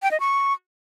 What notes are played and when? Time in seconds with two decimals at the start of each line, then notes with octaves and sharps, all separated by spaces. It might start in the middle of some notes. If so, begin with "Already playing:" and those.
0.03 G5
0.11 D#5
0.20 C#6